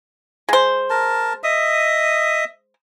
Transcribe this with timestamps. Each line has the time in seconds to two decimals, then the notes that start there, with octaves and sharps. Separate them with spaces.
0.49 G#3 C5
0.90 A#4 A5
1.44 D#5 E5 D#6